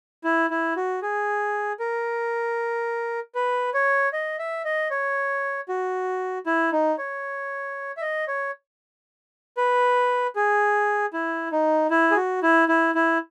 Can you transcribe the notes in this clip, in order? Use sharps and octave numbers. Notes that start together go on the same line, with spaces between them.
E4
E4
F#4
G#4
A#4
B4
C#5
D#5
E5
D#5
C#5
F#4
E4
D#4
C#5
E5
D#5
C#5
B4
G#4
E4
D#4
E4
G#4
F#4
E4
E4
E4